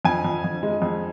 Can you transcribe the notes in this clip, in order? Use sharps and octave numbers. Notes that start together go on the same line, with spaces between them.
F2 G#5
F2
F2
G#3
F2